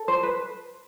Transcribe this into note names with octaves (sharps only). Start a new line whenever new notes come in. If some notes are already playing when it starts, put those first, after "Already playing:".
Already playing: A4
C5
B4